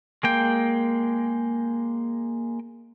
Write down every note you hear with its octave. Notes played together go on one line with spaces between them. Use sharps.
G#3 A#3 G5